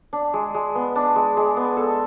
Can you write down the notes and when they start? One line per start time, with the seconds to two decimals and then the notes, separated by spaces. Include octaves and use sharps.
0.13 D4
0.34 G#3
0.54 G#3
0.75 B3
0.96 D4
1.16 G#3
1.37 G#3
1.57 B3
1.77 A4